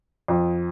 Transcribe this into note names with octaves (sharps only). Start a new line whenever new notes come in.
F2